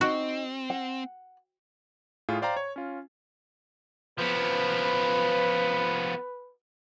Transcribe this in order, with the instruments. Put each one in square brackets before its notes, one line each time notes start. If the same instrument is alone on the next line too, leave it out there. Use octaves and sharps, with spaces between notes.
[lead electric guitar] C4 [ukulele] D#4 [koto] F#4
[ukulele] F#5
[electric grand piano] A2 F4 G#4
C5 D5 F5 G5 A#5
C#5
C#4 F4
[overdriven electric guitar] F3 B3 [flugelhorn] B4